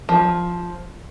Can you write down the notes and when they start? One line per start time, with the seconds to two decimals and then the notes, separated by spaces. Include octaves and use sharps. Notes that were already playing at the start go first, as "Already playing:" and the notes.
0.09 F3